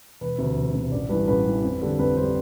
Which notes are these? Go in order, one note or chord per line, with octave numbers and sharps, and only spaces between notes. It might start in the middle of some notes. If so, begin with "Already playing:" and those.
E1 B4
D2 C3
E1
D2 C3
A1 D5
G2 E3 B4
A1 B4
G2 E3
F2
D3 G3
F2 B4
D3 G3 C5